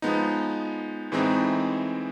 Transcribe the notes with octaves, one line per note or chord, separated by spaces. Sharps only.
F3 G#3 B3 D#4
A2 E3 G#3 C4 D#4